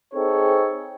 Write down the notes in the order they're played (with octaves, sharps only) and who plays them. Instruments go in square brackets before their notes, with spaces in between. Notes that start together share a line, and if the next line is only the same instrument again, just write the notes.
[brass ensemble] C4 D#4 G#4 A4 C#5